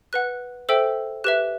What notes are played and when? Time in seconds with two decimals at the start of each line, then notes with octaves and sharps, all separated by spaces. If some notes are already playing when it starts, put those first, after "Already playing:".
0.13 B4 F#5 F#6
0.69 A4 C5 E5 G5 E6
1.24 G4 B4 E5 F#6